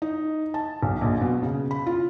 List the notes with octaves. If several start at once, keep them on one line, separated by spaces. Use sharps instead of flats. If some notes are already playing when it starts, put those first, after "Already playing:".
D#4
A5
B1
A#1
B2
C#3
B5
F4